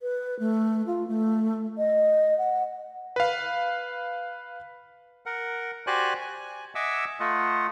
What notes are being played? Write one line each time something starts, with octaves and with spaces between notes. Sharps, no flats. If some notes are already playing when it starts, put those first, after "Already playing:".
B4
A3
F4
A3
D#5
F#5
B4 F5
A#4 F#5
F#4 G4 C5 D5 G#5 F#6
G#5
D#5 E5 F#5 G#5 D6 E6
A3 F4 D#5 F#5